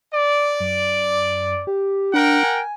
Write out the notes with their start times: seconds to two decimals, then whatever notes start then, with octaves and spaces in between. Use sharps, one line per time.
0.14 D5
0.60 F#2
1.67 G4
2.14 D4 A#4 F#5 G5
2.43 G#5